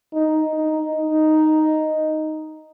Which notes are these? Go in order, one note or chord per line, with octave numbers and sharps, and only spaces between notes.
D#4
D#4
D#4